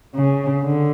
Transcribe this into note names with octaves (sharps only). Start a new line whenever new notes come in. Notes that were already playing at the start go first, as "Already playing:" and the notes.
C#3
D3